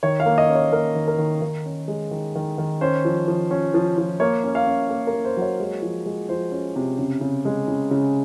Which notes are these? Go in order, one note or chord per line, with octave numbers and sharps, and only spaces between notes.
D#3 C#5
F5
A#3
D#5
C#4
C#5
A#3 A#4
D#3
A#4
D#3
D#3
C#4
G#3
D#3
D#3
D#3
C#4 C5
F3
F3
C#4
F3
F3
A#3 C#5
C#4
F5
C#4
A#3
A#4
A#3
C5
F#3 C#5
G#3
F3
G#3
F3 C5
C#4
C3
C#3
C#3
G#3
C#3
C#3